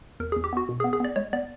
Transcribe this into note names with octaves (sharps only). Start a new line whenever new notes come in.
E2 A#4
G#4
E2
G4
B3 F#4
B2
G#4
B3
G#4
B3 D5
G#3 C#5
B3 D5